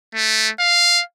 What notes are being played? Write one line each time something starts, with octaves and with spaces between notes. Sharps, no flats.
A3
F5